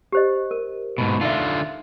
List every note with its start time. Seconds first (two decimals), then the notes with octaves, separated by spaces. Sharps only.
0.12 G4 C5 D#5
0.51 A#4
0.98 G#2 B2
1.21 D3 D#4 F4 E5